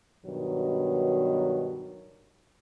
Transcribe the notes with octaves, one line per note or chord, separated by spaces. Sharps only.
G2 B2 D#3 F#3